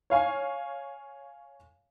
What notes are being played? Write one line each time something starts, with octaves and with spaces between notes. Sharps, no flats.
C#5 F5 G#5